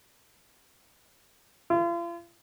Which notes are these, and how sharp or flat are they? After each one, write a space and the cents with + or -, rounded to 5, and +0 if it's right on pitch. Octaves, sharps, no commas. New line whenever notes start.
F4 -40